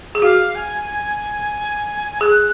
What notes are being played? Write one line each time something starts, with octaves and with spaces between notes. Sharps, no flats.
G#4
F#4 F5
G#5
G#4 F#6